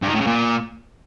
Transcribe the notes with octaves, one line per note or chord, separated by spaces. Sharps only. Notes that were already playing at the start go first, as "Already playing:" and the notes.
G2
D#3
A2
C#3
A#2